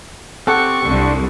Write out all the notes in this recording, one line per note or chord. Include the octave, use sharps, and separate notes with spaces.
C4 G4 A4 F#5 C#6
C2 D4 C5